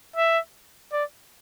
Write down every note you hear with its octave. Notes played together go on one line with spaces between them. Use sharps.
E5
D5